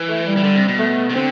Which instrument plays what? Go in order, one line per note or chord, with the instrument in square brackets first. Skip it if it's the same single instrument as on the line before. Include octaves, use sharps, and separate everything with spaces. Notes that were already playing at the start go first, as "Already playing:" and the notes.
Already playing: [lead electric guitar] E3
[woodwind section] A3
G3
[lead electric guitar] E3
D3
C3
B2
[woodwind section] A3
[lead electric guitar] C3
[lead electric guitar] D3 [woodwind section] C4